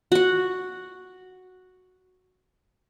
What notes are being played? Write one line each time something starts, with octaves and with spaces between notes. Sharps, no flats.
F#4 F#5